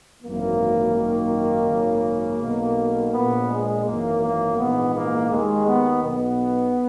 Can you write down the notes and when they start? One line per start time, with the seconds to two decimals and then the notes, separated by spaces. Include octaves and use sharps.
0.23 G#1 F#2 E3 A#3
0.95 G#1 F#2 D#3
1.68 G#1 F#2 C#3
2.40 B1 B2
3.13 A#1 A#2 B3
3.48 G#3
3.85 G#1 F#2 E3 A#3
4.21 A#3
4.57 A#1 G#2 E3 B3
4.94 A#3
5.30 D#2 D#3 G#3
5.66 B3
6.02 B1 B2 B3